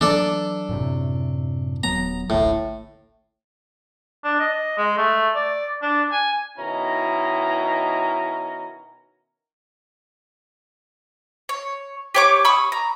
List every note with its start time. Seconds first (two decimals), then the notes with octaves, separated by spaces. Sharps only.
0.01 E3 F#3 D4 A4 D5
0.69 F#2 A2 C3
1.83 D#1 F#3 B3 A#5
2.30 D1 A1 A2 D3
4.24 D4
4.40 D#5
4.78 G#3
4.98 A3
5.35 D5
5.82 D4
6.12 G#5
6.58 B2 D#3 C#4 E4 A#5
11.49 C#5
12.15 G4 C#5 D6
12.45 B5 C#6 D#6 E6
12.72 A#5